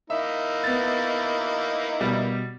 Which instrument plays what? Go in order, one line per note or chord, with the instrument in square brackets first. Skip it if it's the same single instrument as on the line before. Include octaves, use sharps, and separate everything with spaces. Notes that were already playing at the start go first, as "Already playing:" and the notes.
[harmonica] A#3 D#4 E4 [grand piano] E5
[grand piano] B3 A6
B2 G3